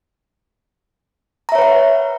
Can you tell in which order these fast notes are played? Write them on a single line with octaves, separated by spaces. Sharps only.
A#5 E5 C#5 B4 F#5